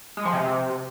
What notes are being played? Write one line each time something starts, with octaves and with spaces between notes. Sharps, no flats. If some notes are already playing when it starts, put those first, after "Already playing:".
G#3
F3
C3